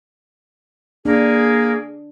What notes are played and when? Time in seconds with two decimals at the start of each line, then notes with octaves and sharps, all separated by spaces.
1.05 A#3 D4 G#4